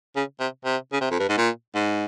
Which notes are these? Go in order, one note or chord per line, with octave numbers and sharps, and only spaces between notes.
C#3
C3
C3
C#3
C3
F2
G2
G#2
A#2
G#2